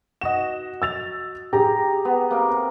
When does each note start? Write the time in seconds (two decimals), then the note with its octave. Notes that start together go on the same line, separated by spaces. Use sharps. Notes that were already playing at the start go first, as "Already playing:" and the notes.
0.21 F#4 D#5 E7
0.82 E6 A6 F7
1.53 G4 G#4 A#5
2.05 B3
2.31 C3 A#3